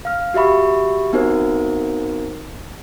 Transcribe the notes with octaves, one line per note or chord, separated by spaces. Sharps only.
F5 F6
F#4 G4 E5 B5 C#6
B3 C4 D#4 F#4 A#4 C5